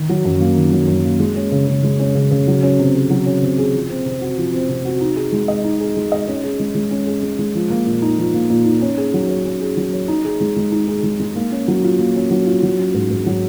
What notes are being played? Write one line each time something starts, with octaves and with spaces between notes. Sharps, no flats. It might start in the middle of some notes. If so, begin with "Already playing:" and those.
Already playing: D#3 D#4
F#3
F#2
A#3
D#3
F#3
F#2
A#3
G#3
C#4
C#3
C#3
G#3
C#4
C#3
C#3
F#3
C#4
C3
G#4
F#3
C#4
C3
G#4
F3
C4
C3
F#4
F3
C4
C3
F#4
D#4
G#4
G#3
D#5
D#4
G#4
G#3
D#5
C#4
G#4
G#3
G#3
C#4
G#4
G#3
G#3
F3
A#3
A#2
D#4
F3
A#3
A#2
D#4
C#4
G#4
F#3
C#5
C#4
G#4
F#3
C#5
D#4
G#4
G#3
G#3
D#4
G#4
G#3
G#3
A#3
C#4
F#3
F4
A#3
C#4
F#3
F4
F#3
C#4
G#2
G#2
F#3